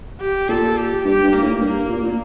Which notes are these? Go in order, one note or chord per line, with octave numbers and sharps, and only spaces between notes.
G4
A#2 A4
G4
G2 G4
G2
A#3
A2
G2 A#3
A#2
A#2